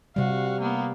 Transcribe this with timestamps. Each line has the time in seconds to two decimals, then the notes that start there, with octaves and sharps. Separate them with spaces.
0.16 C3 G3 F#4 F5
0.61 A#3 B3